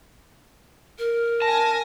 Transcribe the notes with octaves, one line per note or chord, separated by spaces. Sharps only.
A#4
G#5 A5 A#6